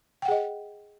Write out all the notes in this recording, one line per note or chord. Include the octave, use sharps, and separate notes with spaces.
G#4 D#5 F#5 G5